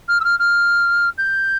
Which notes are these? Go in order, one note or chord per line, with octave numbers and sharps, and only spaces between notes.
F6
E6
F6
F6
G6